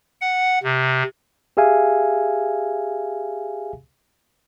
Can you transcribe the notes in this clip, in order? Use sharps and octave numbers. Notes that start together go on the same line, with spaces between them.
F#5
C3
G4 G#4 E5 F5 G#5